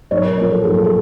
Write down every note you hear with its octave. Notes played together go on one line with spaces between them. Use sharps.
B1 C#5
A#4
A#2 F3 A#4
A4
B1 G#4
A4
G#4